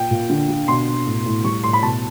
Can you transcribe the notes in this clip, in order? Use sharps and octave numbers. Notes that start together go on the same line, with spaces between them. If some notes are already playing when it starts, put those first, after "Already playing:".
Already playing: A#2 G5
A#2
D3
D3
B2 C6
B2
A2
A2
G3 C#6
A2 C6
B5
B2 A5